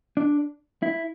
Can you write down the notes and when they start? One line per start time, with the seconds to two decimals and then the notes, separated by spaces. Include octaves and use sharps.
0.17 D4
0.83 E4